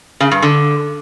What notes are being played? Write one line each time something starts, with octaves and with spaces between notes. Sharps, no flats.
C#3
G2
D3